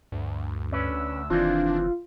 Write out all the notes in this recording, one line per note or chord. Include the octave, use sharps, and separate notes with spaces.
D2 G2
C#4 D4 B4 E6
F1 D#3 E3 C4 D4 F4